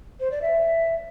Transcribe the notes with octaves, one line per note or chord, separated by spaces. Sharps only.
C5
D5
E5